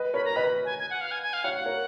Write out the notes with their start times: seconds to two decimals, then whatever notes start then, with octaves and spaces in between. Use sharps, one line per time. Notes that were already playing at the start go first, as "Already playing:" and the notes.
Already playing: B4 D#5
0.14 A#4 C#5 B5
0.25 A#5
0.36 B4 D#5 B5
0.65 G#5
0.79 G#5
0.90 F#5
1.01 F5
1.11 G#5
1.23 G#5
1.33 F5
1.44 C#5 F5 F#5
1.54 F#5
1.66 A#4 C#5